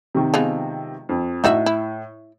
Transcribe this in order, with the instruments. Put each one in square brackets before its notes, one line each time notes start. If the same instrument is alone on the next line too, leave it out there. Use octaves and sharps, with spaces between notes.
[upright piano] C3 D#3
[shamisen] F3 G#3 B3
[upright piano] F2
[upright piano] A2 [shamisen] D#4 F#4 E5
[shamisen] E4